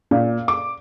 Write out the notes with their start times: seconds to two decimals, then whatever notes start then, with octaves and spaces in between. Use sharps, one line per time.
0.11 A#2
0.48 D6